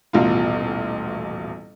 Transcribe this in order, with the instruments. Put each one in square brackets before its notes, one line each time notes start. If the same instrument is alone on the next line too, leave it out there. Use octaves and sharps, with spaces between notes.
[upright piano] D#1 A1 B2 F4